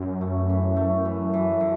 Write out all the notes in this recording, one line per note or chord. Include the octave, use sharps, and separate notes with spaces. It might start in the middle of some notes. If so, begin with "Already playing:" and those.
Already playing: F#2
A3
E3
A3
E3
E3
D3